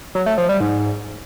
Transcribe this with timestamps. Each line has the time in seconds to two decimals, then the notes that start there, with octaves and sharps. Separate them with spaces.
0.15 F#3
0.26 A3
0.38 F3
0.49 G3
0.60 G#2